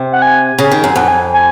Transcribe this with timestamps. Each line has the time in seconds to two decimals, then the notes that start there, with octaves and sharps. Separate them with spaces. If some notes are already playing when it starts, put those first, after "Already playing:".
Already playing: C3
0.12 F#5
0.22 G#5
0.59 C#3
0.71 D#3
0.84 F#2
0.96 F2 F#5
1.08 G#5
1.33 G#5